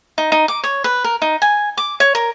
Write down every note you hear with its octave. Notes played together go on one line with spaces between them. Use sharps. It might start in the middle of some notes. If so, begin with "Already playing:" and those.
D#4
D#4
D6
C#5
B4
A#4
D#4
G#5
D6
C#5
A#4